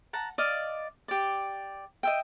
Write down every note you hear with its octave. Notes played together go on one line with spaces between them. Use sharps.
F#5 A5 A#5
D5 D#5 F5
G4 D5
D#5 E5 G5